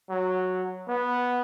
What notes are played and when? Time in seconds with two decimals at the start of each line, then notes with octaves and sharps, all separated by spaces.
0.10 F#3
0.88 B3